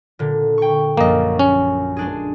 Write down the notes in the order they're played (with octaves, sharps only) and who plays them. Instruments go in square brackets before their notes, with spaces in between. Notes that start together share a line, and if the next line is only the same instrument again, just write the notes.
[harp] A#2 D3
G5 C#6
[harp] A#1 F#2 [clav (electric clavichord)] A#3 D#5
[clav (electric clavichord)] C#4
[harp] G#3 D4 G#4